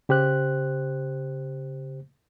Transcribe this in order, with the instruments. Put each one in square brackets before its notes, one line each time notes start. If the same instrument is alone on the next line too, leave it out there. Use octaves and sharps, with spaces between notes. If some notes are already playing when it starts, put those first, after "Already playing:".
[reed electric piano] C#3 G4 C5 F#6